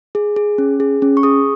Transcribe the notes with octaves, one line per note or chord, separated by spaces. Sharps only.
G#4
G#4
C#4
G#4
C#4
C#6
G#4 D#6